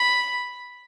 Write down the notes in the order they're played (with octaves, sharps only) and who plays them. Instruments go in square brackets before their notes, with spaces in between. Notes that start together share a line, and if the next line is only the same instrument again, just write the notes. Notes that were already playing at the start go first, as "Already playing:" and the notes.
Already playing: [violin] B5